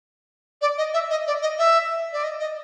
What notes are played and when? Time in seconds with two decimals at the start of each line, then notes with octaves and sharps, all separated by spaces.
0.62 D5
0.78 D#5
0.94 E5
1.10 D#5
1.27 D5
1.42 D#5
1.58 E5
2.13 D5
2.24 D#5
2.40 D#5